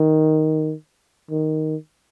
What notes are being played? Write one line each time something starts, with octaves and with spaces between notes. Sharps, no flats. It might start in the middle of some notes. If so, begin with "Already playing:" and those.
Already playing: D#3
D#3